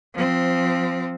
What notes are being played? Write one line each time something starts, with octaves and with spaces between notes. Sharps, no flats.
F3 C4